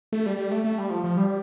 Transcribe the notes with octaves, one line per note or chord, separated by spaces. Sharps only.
A3
G3
G3
A3
A3
G3
F3
F3
G3